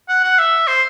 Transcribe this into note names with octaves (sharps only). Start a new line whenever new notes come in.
F#5
F#5
E5
C5